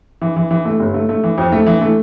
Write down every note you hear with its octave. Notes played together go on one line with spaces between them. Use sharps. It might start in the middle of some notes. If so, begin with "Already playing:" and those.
E3
E3
E3
A3
G1
A3
A3
E3
F2
A3
E3
A3